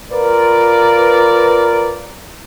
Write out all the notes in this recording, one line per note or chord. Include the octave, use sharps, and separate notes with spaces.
F4 A#4 B4 D5